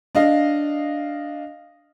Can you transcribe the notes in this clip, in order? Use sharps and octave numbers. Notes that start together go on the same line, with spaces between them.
D4 D#5 F5